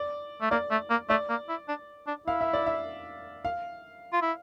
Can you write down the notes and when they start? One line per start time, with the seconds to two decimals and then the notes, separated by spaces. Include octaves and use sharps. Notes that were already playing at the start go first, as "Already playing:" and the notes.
Already playing: D5
0.41 A3
0.51 A#3 D5
0.71 A3
0.90 A#3
1.10 A3 D5
1.29 A#3
1.49 E4
1.68 D4
2.07 D4
2.27 E4 F5
2.41 E5
2.53 D5
2.66 E5
3.45 F5
4.13 F4
4.22 E4